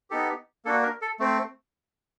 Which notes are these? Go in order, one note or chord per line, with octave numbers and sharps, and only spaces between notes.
B3 D#4 G4 A4
A#3 D4 F#4 A4
A#4
A4
A3 C4